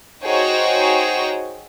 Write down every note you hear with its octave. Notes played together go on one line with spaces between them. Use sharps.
D#4 F#4 G#4 C5 C#5 G5